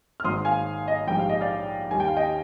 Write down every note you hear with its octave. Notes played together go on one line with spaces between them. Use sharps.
F6
G#1 G#2 D#3 C6 D#6
F5 G#5
D#5
A#1 G#2 G3 G5
F5
D#5
D5 F5
D#2 D#3 G3 G#5
G5
F5
D#5 G5